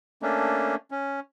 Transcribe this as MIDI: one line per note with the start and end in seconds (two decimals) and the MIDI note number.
0.22 0.75 57
0.22 0.75 58
0.22 0.75 61
0.22 0.75 62
0.91 1.20 61